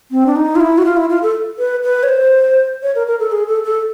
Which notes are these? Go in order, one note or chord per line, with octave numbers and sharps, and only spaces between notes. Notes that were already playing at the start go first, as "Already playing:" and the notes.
C4
D4
D#4
F4
E4
F#4
F4
E4
F4
A4
B4
B4
C#5
C5
C#5
A#4
A#4
A4
G#4
A4
A4